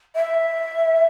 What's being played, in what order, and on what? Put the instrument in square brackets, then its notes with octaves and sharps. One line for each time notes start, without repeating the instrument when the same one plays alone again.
[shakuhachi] E5